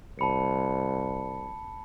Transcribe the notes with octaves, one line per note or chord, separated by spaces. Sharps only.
C2 A5 B5 C#7